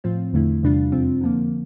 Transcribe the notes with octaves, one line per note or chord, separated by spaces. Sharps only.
A2 F3 C4 F4
E2 D3 A3 E4
E2 C3 G3 D4 F4
F2 C3 F3 C4 F4
D3 F3 A#3